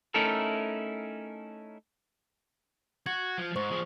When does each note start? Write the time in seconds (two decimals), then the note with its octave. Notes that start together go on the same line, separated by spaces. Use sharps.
0.14 A3 C#4 D#4 E4 A4 A#4
3.06 F#4 G#6
3.38 F3
3.56 G#2 C5 C#6
3.70 F3 G#4